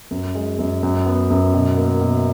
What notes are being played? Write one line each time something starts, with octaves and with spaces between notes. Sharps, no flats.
F#2
G#3
F#2
F#2
B3
F#2
B2
A#3
B2